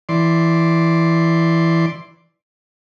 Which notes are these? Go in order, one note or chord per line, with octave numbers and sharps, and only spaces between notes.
E3 D5 C6